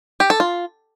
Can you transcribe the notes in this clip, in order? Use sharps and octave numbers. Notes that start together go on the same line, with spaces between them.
G4
A4
F4